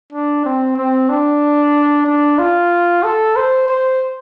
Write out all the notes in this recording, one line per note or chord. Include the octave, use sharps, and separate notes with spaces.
D4
C4
C4
D4
D4
F4
A4
C5
C5